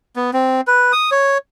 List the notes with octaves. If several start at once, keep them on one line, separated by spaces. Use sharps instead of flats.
B3
C4
B4
D#6
C#5